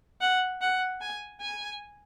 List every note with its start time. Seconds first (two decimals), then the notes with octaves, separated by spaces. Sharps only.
0.21 F#5
0.61 F#5
1.01 G#5
1.41 G#5